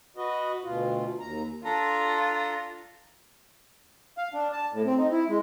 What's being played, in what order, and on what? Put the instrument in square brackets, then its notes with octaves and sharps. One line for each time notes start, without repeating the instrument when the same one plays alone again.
[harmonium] F#4 B4 D#5
D2 B2 F4
D#2 A#5
[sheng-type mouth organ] D4 A4 A#5 [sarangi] F4
[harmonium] F5
D4
A5
A2
C4
D#4
E4
G#3